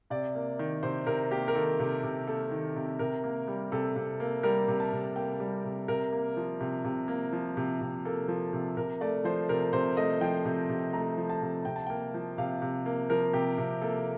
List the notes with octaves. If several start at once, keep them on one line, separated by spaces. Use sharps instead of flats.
C3 D5
A#3
D#3
C3 C5
C3 A#4
A#3 G4
A#4
D#3 A4
C3
C3
A#3 A4
D#3
C3
C3 A#4
A#3
G3
C3 A4
C3
A#3
G3 A#4
C3
A5
C3
A#3 G5
G3
C3
C3 A#4
A#3
F3
C3
C3
A#3
F3
C3
C3
A#3 A4
F3
C3
C3 A#4
A3 D5
F3 C5
C3 A#4
C3 C5
A3 D#5
F3 G5
C3
C3
A3 A#5
F3
A5
C3
C3 G5
A5
A#3 G5
F3
C3 F5
C3
A#3
F3 A#4
C3 G4
C3
A#3 A4